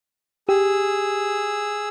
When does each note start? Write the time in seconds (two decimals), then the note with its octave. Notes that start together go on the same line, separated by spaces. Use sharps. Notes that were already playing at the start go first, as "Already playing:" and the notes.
0.49 G4 G#4 E6